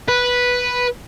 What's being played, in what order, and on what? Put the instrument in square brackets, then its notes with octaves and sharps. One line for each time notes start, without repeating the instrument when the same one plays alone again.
[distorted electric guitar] B4